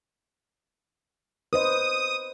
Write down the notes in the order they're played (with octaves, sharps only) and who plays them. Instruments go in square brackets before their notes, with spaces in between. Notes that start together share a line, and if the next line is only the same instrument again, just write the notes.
[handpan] B4 C5 D#5 [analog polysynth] D#6